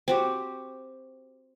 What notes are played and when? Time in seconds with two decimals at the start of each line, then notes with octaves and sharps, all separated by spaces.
0.08 C4 F#4 G4